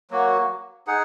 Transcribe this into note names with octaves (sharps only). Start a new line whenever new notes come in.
F#3 A#3 F#4
D#4 G#4 F#5